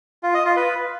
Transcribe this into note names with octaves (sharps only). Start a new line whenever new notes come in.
F4
D#5
F4
B4